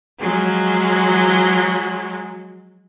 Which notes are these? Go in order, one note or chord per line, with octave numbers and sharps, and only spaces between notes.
F3 F#3 G#3